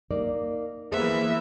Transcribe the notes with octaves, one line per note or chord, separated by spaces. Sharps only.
A#3 D#4 D5
E3 A#3 B3 G#4 C5 E5